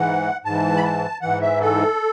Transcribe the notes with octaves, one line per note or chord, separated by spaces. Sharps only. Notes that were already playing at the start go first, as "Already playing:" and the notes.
Already playing: G#2 E3 F#5
G#2 E3 A5
B5
A5
G#2 E3 F#5
E5
A4